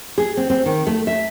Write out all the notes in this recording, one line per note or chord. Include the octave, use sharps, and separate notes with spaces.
G#4
C4
C4
D#3
A3
E5